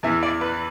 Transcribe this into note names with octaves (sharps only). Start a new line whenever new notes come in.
E2 E3 E5
D5
B4